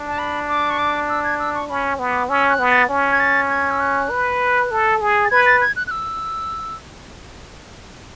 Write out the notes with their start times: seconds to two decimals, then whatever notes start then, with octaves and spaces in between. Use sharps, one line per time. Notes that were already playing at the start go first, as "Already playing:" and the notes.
Already playing: D4
0.08 A5
0.19 B5
0.49 D6
0.70 C#6
0.79 D6
1.09 E6
1.24 G#6
1.39 E6
1.55 C#6
1.69 C#4 B5
1.99 B3
2.10 D6
2.29 C#4 E6
2.50 F#6
2.59 B3
2.70 A6
2.89 C#4
3.12 G#6
3.20 A6
3.50 G#6
3.71 E6
3.80 F#6
4.10 B4
4.71 A4
5.01 G#4
5.25 A6
5.30 B4 G#6
5.46 A6
5.61 G#6
5.76 F#6
5.87 F#6
5.91 E6